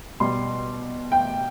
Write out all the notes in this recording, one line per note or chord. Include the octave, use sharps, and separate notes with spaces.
B2 G3 C6
G5